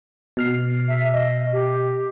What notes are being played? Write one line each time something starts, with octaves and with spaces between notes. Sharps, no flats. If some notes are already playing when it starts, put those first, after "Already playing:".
B2 F6 C7
E5
D#5
G4